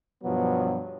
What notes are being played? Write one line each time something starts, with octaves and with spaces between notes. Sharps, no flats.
G2 B2 F3 F#3 B3